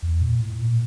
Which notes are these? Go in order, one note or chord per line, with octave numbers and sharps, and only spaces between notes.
E2
A#2
A2
A#2